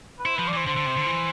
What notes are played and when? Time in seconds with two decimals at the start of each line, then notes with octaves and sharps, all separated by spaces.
0.19 B4
0.25 E4 C5
0.36 F3 B4
0.48 D5
0.53 E3 C5
0.66 D3 C5
0.77 D3
0.86 C3
0.97 D3
1.07 E3